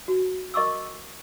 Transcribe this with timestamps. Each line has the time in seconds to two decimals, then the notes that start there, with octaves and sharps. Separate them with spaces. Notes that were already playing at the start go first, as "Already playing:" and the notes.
0.08 F#4
0.54 A#4 D#5 C#6 D6 E6